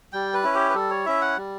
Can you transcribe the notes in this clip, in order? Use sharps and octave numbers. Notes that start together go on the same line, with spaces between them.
G3 G5
B4
C#4 E4
G4
B4
G3 A4
C#5
C#4 E4 E5
F#5
G3